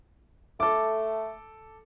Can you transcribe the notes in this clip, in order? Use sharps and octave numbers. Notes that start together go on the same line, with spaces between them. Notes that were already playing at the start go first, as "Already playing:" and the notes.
A3 A4 D6